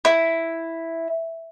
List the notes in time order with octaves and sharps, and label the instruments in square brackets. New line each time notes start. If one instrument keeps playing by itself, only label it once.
[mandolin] E4